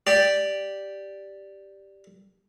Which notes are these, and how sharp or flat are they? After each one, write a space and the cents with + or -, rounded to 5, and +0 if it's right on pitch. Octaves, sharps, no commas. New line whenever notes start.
G4 +0 D5 +0